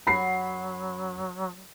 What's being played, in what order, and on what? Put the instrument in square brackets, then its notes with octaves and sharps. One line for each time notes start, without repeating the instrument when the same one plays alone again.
[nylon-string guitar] F#2 F#4 [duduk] F#3 [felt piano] B5 C7